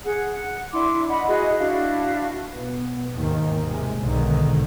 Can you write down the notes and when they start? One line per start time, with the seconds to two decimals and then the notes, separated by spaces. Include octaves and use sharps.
0.05 G#4 F#5
0.31 F#5
0.72 D4 E4 C6 D6
1.09 D#5 F#5 B5
1.28 E4 F#4 G#4 D#5
1.59 D4 E4 F#4 F5
2.52 B2 B3
3.14 D#2 G#2 D#3
3.65 C3 G#3
3.99 B1 G#2 D3 D#3